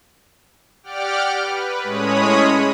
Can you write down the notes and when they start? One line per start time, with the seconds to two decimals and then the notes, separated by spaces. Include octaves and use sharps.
0.83 G4 D5 F#5 G5 D6 F6
1.40 B4
1.83 A2 G#3 C#4 C#5 B5 D#6